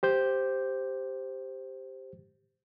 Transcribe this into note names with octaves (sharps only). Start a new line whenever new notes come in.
G4 C5 G6